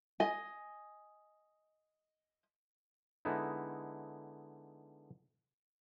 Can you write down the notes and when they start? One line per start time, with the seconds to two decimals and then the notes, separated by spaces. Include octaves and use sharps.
0.20 D#5 G#5
3.25 D3 G#3 B3 D#4 E4